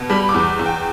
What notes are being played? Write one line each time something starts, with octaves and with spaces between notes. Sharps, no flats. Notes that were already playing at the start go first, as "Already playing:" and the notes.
Already playing: B2
G3 B5
D6
E2
E2
G5